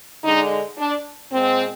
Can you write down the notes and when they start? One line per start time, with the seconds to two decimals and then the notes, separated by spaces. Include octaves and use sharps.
0.24 D3 G#3 D#4
0.78 D4
1.31 A#2 G#3 C4